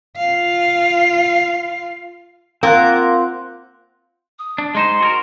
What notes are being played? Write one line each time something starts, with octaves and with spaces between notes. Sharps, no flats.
F4 F5
A#3 C4 F4 F#5
D#6
D4
G#3 D#4 C5 C6
F#4 G#4 A#4